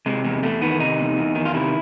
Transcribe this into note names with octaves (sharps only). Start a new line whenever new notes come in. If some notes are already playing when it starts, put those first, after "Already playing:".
C3 G#3
E2 G#3
E2 A3
D#3 B3
C3 D#4
E2
E2
D#3
F4
C3 E4